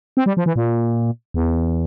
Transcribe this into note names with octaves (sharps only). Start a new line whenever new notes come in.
C4
G3
F3
E3
A#2
E2